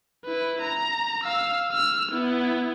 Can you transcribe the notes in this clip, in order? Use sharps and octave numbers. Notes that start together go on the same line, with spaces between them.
E4 B4
A#5
F5 E6
E6 F6
B3 E4